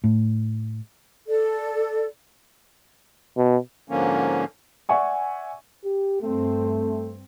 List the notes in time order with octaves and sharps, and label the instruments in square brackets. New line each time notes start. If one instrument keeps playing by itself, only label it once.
[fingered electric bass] A2
[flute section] A4 D5
[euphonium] B2
[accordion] G#2 D3 F3 A#3 C#4
[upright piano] D5 E5 F#5 G#5 C#6
[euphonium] G4
[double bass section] G2 C4 [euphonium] A3